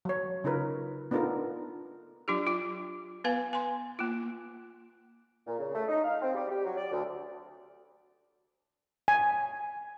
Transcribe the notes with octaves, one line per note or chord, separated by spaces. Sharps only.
F#3 C#5
C#3 D#4 F4 A#4 B4
B3 D4 D#4 F4 A4 A#4
F#3 D4 F4 G4
F4
B3 B4 F5 G#5
G#5 C6
A#3 F4
A#2
C#3
A3
D#4
F5
C4
G3
G4
F#3
D5
D2
G#5